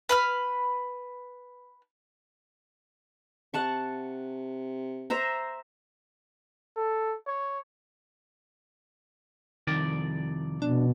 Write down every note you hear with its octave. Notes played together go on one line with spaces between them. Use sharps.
B4 B5 F6
C3 F#5 A5 C#6
C5 E5 A#5
A4
C#5
C2 F2 D#3 D5
B2 D4